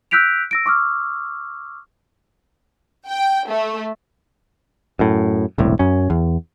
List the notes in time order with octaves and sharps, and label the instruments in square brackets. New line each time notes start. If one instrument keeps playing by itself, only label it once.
[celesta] E6 F#6 G6 B6 D7 F7
E6 A#6 D7
C#6 D6 E6 F6
[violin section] G5
A3
[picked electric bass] F#2 A2
E1 C2 A2
F#2 C#4
E2